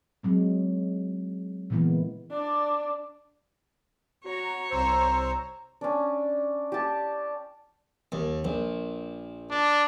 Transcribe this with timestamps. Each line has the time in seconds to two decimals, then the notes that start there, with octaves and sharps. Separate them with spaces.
0.23 F#3 G#3 C4
1.70 A#2 C#3 E3 G#3 A#3 B3
2.31 D4 D5
4.24 F#4 C#5 A#5
4.70 C2 C5 A#5 E6
5.81 C#4 D4
6.72 G4 A5
8.12 D#2
8.45 A#1
9.51 D4